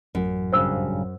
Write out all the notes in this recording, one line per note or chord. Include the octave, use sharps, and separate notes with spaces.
A1 F#2 F#3
G2 A#2 C#3 C5 E6